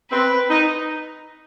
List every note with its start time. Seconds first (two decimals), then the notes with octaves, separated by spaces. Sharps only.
0.10 C4 B4
0.50 D#4